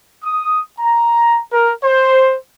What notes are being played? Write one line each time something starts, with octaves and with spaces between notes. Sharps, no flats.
D#6
A#5
A#4
C5